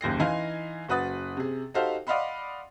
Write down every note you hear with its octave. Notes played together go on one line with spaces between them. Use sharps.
F#1 D#2 A#6 C7
E3 D#4 F5 G#5 C6
F#1 F#4 B4 D#6 A6
C3 G#4
D#4 F#4 G4 A4 C5 F5
D5 D#5 F5 F#5 B5 C6